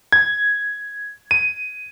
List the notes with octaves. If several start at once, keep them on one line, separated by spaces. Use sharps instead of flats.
G#6
D#7